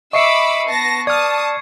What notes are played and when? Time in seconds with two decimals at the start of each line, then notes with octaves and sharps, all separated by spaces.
0.13 D#5 E5 B5 C#6 D6 E6 C7 C#7
0.68 B3 A5 A#6
1.07 D5 A5 D#6 F6 G#6